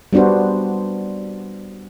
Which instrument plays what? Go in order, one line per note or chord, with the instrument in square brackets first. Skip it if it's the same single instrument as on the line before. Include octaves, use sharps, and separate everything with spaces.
[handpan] G3 B3 D4 F#4 C5